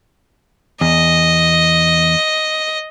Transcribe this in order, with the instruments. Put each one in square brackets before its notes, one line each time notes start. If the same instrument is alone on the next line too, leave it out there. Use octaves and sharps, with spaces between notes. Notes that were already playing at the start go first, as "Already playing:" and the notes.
[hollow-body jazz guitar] E2 [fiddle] D#5